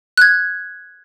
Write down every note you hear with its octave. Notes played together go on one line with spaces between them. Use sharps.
F#6 G#6